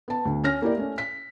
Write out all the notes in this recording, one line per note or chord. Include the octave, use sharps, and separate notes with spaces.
B3 A5
D2
C#4 F6 A#6
A#3 E4 G4 D5
A3 C#4
B6